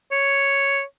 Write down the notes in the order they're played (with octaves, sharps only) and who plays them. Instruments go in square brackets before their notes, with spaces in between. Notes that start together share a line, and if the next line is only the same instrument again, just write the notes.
[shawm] C#5